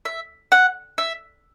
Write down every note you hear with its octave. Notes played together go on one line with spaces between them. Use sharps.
E5
F#5
E5